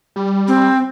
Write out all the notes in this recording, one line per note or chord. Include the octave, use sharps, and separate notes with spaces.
G3
C4